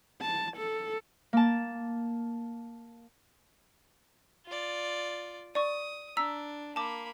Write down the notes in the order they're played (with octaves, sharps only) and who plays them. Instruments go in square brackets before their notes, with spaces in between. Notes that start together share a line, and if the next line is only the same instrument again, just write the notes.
[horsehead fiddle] A5
A4
[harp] A#3 A5
[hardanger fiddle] F4 D5
[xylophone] D5 C#6 [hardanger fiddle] D#6
[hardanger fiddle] D4 [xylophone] A#5 E6 B6
[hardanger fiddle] A#3 B5 [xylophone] A5 D6